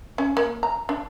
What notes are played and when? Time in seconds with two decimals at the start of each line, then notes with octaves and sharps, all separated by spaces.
0.18 C#4
0.37 A#3
0.63 A#5
0.89 D4